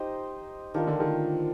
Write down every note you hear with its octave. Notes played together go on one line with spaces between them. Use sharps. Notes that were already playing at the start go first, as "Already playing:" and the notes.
Already playing: D#4 G4 C5 D#5
D#3 D4 F4 A#4
D3
D#3